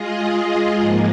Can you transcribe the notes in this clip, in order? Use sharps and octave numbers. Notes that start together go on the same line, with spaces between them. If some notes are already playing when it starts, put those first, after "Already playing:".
Already playing: G#3 F4 G#4 D#5
G#2 F3 A#3